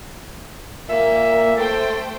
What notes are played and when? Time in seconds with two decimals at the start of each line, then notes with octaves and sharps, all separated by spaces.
0.89 A#2 A#3 E5
1.56 A3 A4 C5 G5